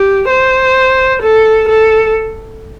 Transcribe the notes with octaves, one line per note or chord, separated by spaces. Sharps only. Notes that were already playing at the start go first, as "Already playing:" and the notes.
Already playing: G4
C5
A4
A4